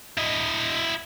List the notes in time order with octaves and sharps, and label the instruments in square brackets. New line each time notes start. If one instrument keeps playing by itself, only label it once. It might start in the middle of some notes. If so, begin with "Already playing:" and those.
[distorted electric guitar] E4 D#5